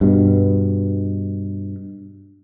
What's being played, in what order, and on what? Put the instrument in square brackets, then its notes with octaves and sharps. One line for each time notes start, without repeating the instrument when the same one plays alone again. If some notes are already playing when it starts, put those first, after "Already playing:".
[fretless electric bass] G2 B2